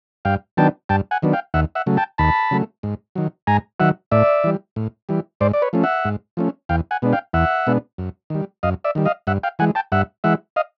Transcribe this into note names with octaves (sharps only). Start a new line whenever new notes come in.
G2 F5 G5
D#3 F#3 B3 D4 G5 A5
G2 G5 A5
F#5 G#5
D#3 F#3 B3 D4
F5 G5
D#2 E5 F#5
E5 F#5
C#3 F#3 A3
G5 A5
D#2 A5 B5
C#3 F#3 A3
G#2
D#3 F#3
G#2 G#5 A#5
D#3 F#3 E5 F#5
A2 D5 E5
E3 G3
A2
E3 G3
G#2 C5 D5
D5
B4 C#5
F3 A3 C#4
E5 F#5
G#2
F3 A3 C#4
E2 F5 G5
F#5 G#5
B2 G#3 B3 D4
F5 G5
E2 E5 F#5
B2 G#3 B3 D4
F#2
D#3 G3
F#2 D#5 F5
D5 E5
D#3 G3
D#5 F5
G2 E5 F#5
F5 G5
E3 G#3 F#5 G#5
G5 A5
G2 E5 F#5
E3 G#3 E5 F#5
D#5 F5